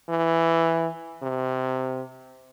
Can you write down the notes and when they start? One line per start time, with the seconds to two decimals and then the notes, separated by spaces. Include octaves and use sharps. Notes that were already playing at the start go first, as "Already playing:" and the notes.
0.09 E3
1.22 C3